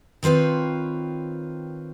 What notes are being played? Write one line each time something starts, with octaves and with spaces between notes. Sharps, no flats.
D#3 C4 F4 B4 C#5